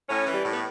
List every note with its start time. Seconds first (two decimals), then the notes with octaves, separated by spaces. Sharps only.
0.08 A2 C#4
0.27 E3
0.33 G3
0.45 A2
0.51 B3